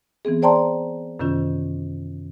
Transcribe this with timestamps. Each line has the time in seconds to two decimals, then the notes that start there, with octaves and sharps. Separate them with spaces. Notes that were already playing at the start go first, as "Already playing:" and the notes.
0.25 E3 B3 C4 G#4
0.42 C5 D5 G5 A5 A#5 C6
1.19 F#2 C3 D#3 C#4 F4